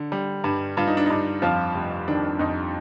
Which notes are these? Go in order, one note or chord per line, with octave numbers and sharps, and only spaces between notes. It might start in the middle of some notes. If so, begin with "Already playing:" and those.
Already playing: D3
G3
G2
G2 F4
D#4
D4
G2 D#4
F2 F3 F4
F1
D#3 D4
F2 D#4